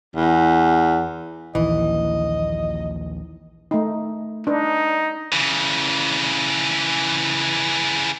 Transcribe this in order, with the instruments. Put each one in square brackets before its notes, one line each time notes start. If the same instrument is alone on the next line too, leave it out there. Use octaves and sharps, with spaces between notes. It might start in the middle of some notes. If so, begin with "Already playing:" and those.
[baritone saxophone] E2
[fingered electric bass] A#1 D#2 [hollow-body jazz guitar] E3 [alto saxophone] D#5
[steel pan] A3 D#4
[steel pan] D4 B4 [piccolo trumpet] D#4
[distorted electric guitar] C#3 E3